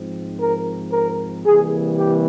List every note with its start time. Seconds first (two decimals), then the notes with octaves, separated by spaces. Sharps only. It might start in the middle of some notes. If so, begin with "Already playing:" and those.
Already playing: G#2 F3 C4
0.38 A#4
0.92 A#4
1.45 C3 E3 G3 A#3 G#4
1.98 G4